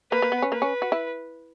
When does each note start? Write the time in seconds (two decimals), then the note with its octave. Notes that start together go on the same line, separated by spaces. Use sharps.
0.12 A#3 B4
0.22 A#3
0.32 B3
0.42 C#4
0.52 A#3 B4
0.62 C#4
0.82 F#4
0.92 E4